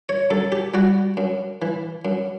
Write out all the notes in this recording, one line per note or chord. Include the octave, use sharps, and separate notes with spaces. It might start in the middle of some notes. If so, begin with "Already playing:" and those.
C#5
F#2 A4
G4
G3 F#4
F#2
E3
F#2